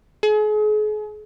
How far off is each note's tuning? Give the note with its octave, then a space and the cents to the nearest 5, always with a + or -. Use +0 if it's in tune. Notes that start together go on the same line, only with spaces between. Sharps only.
G#4 +40